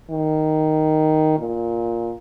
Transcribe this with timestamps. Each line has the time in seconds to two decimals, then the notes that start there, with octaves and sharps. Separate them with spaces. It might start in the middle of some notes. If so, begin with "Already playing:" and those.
0.10 D#3
1.39 A#2